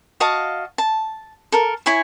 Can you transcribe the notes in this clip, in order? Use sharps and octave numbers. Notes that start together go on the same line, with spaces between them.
F#4 D#5 F5 A5
A5
A4 A#4
E4 C#5 G#5